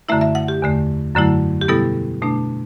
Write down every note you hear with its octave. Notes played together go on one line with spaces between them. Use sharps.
F#2 D3 A3 E4 E5
E5
F#5
G4
E2 D3 A3
F#2 D3 F#3 A3 E4
G4
B2 G3 B3 E4 A4
B2 A3 D4